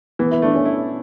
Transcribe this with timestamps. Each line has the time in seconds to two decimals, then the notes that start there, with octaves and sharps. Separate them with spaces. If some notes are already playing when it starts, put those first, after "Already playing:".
0.19 E3 B3
0.31 E4
0.42 A3 D4
0.55 C#4
0.65 E4